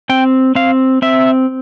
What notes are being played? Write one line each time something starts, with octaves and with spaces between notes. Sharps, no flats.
C4 G5
C4 F5
C4 E5